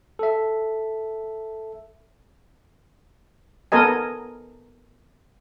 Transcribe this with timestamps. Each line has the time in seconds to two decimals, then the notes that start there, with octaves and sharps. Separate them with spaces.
0.19 A4 E5
3.72 B3 A4 A#4 D#5 G#5